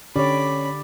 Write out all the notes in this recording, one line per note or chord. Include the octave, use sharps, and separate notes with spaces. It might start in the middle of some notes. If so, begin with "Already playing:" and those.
D3 C#4 G4 C#5 D5 B5